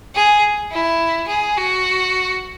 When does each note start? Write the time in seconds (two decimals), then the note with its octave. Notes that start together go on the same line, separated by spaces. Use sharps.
0.15 G#4
0.72 E4
1.28 G#4
1.57 F#4